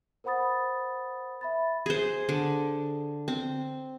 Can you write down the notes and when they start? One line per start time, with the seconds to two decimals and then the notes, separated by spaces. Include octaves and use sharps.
0.24 A#4 C5 F#5 B5 D#6 A6
1.41 E5 B5 A6
1.86 G#4 C5
2.29 D3
3.28 C4